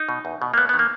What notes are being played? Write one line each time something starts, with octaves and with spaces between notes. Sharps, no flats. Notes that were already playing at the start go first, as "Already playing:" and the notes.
Already playing: D#4
B2
E2
B2
A#3
D#2 B3
B3
D#3
A#3